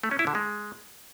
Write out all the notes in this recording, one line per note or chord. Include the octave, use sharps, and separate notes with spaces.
A3
C#4
E4
D3
G#3